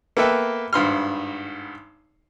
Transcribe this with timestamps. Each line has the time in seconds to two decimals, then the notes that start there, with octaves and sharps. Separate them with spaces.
0.17 A#3 B3 A4 B4 E5 G5
0.73 G#1 G2 C6 F6